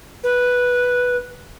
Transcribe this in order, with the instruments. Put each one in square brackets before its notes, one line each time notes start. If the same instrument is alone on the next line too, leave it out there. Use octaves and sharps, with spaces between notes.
[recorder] B4